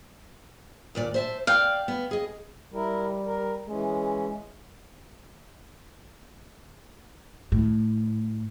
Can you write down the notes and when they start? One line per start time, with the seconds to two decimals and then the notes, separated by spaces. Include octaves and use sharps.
0.95 D#2 A#2 D5
1.14 C5 E5 A5
1.47 D5 F5 G5
1.88 B3
2.11 G#4 D#5
2.73 G3 E4 A#4
3.25 A#4
3.68 E3 G#3 C#4
7.52 A2